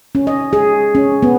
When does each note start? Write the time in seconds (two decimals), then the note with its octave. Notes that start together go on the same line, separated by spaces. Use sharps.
0.15 C#4
0.27 D#5
0.53 G#4
0.95 C#4
1.23 B3